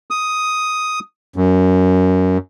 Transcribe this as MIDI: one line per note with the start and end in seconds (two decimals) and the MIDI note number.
0.11 0.99 87
1.36 2.38 42